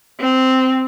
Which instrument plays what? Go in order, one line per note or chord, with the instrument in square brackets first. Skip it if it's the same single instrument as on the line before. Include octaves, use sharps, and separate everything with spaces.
[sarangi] C4